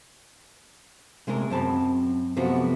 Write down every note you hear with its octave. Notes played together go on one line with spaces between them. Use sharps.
C3 G#3 A3 G#4 A#4
F#2 C4 A5 B5
F#2 C3 F3 A3 B3 F#4